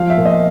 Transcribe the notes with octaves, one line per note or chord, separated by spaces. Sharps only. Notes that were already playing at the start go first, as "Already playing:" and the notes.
Already playing: F3 F5
E5
A#2
D#5